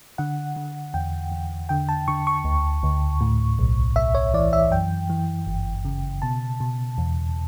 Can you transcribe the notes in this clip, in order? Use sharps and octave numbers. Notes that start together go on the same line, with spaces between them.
D3 F#5
D3
E2 G5
E2
D3 G5
A5
D3 C#6
C#6
D2
D2
A2
B1
B1 E5
C#5
E3 D5
E5
F#2 G5
E3
G1
C#3
B2 A5
B2
E2